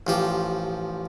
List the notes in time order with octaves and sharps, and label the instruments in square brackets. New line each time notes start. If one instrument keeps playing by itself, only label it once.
[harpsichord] A1 F3 G4